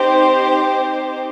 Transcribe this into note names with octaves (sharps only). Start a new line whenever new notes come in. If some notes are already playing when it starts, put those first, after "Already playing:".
Already playing: C4 D#4 G4 C5